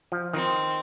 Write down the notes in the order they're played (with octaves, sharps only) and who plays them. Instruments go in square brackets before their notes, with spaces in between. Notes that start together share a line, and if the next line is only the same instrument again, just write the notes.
[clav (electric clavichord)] F3
[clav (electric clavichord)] D#3 [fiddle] C4